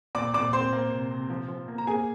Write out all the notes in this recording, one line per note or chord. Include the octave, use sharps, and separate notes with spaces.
A#2 D5 D6
A#2 D5 D6
C4 C5 C6
A#3
C3
C3
F3
F3
A#3
A#5
A#3 G#4 G#5